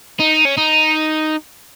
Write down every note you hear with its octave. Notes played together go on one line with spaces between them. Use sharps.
D#4
C#4
D#4